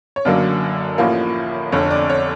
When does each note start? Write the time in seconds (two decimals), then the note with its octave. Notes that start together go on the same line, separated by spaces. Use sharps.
0.16 C#5
0.25 F#1 F#2 D3 F#3 A#3 D5
0.98 A1 A2 F3 A#3
1.72 F1 F2 D3 C#5
1.91 D5
2.10 C#5